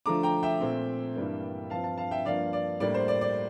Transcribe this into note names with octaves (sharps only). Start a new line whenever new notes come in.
D3 F3 A3 D4 A#5 D6
G5 A#5
E5 G5
A#2 A3 C4
G2 E3 G3 A#3 D4
G2 F3 C4 F5 A5
F5 A5
F5 A5
E5 G5
G2 F3 A#3 D4 D5 F5
D5
A2 G3 A#3 D4 D5
C5
D5
D5